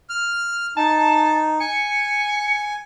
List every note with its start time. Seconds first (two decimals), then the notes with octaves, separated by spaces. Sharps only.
0.09 F6
0.77 D#4 A5
1.60 G#5 C#7